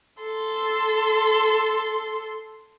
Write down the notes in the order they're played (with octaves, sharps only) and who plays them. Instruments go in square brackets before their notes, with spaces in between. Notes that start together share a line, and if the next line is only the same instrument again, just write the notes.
[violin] A4 C6